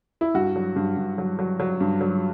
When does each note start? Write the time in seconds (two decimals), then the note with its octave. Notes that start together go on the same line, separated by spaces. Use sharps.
0.21 E4
0.34 G2 F#4
0.56 F#3
0.76 G2
0.97 G2
1.18 F#3
1.39 F#3
1.60 F#3
1.81 G2
2.01 F#3